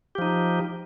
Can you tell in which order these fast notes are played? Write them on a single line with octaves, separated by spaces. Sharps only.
G4 F3 D#4